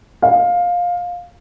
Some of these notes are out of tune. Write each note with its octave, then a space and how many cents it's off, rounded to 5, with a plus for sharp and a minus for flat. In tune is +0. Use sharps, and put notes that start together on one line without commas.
F5 +15